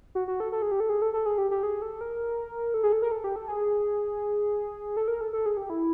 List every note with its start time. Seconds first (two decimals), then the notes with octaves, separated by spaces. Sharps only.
0.15 F#4
0.28 F#4
0.40 A4
0.52 A4
0.62 G#4
0.71 G4
0.80 A4
0.89 G#4
1.02 A4
1.13 A4
1.26 G#4
1.38 G4
1.51 G4
1.63 G#4
1.82 A4
2.01 A#4
2.74 A4
2.83 G#4
2.92 A4
3.02 A#4
3.12 A4
3.24 G4
3.36 A4
3.48 G#4
4.97 A4
5.08 A#4
5.21 A4
5.33 A4
5.46 G#4
5.57 G4
5.70 E4